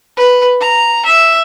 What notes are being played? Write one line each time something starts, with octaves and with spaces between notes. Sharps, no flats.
B4
A#5
E5